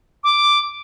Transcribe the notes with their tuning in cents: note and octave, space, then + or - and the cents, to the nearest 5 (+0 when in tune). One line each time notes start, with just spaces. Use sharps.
D6 +0